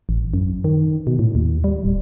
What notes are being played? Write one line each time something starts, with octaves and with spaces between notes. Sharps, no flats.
A1
F#2
D#3
B2
A2
D#2
G3
D1